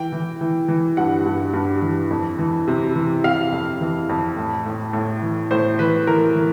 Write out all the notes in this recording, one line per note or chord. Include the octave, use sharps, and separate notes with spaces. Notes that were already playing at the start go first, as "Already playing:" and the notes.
Already playing: E3 G5
E3
E3
E3
G2 F#5
G2
G2
E3
F2
E3
C3
E3
C3 F5
F2
E3
F2
A2
A2
A2
E3
A2 C5
E3 B4
E3 A#4
E3